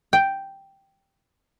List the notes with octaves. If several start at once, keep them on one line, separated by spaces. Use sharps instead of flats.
G5